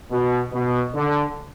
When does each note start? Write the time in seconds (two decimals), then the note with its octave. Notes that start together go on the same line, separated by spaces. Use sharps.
0.11 B2
0.53 B2
0.94 D3